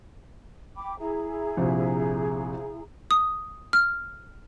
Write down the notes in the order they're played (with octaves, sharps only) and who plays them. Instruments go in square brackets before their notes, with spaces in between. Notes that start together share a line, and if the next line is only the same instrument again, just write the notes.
[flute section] G5 B5 D6
E4 G#4 A#5
[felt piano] A#1 C3
[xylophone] D#6
F6